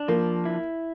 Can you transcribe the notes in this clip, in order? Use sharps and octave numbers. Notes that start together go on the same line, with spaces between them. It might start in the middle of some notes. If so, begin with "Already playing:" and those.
Already playing: D4
F3 A#3
E4